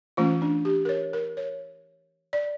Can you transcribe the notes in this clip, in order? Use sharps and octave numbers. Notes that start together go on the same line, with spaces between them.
E3 A3 C#4 F4
D4
G4
A#4
C#5
A#4
C#5
D5